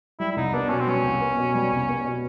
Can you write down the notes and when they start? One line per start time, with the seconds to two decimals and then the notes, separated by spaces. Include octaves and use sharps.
0.20 G3 E4
0.31 E4
0.36 C2 D#4
0.54 B3 D4
0.70 B2 C#4
0.80 C4
0.87 G3 C#4
1.04 C2
1.21 B3
1.38 B2
1.54 G3
1.71 C2
1.89 B3
2.05 B2